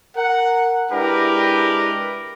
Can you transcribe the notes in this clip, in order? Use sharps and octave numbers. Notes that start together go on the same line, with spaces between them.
A#4 F#5
G#3 D4 E4 G4 A#4 B4